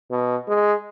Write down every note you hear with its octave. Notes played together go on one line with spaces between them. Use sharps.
B2
G#3